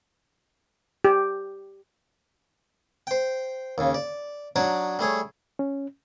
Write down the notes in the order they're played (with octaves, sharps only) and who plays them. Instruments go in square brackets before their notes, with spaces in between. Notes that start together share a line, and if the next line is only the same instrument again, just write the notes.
[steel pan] G4
[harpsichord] C5 G5
D#2 C#3
D5
F#3 D4 D#4 C#5 D5 D#6
G3 A3 G#4 C#5
[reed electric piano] C#4